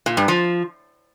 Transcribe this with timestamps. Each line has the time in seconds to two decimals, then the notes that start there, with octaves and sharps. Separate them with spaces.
0.06 A#2
0.17 G2
0.28 F3